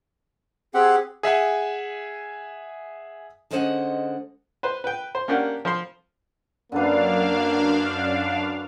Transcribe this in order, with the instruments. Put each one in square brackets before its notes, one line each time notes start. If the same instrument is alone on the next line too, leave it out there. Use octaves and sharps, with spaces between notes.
[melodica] C4 G4 F#5 [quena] G#4
[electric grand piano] G#4 E5 F#5 G#5
[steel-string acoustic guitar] D3 G#3 C#4 C5 D#5 F#5
[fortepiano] B4 C5
B4 G5
C5
A#3 C#4 D4 G4 A#4 F#5
F3 C5 C6
[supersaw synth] F#2 D4 F5 [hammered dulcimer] D3 B4 [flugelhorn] A#3